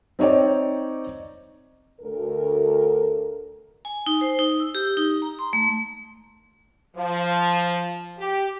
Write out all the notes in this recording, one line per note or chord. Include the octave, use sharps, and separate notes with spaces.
C4 D#4 C#5 D5 G5
D2 A4 A#4
G#5
D#4
C5
D#4
E6
G4
D#4
A#5
C6
A3
F3
G4